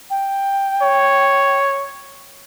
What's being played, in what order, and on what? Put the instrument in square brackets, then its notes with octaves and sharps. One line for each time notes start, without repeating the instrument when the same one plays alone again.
[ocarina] G5
[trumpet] C#5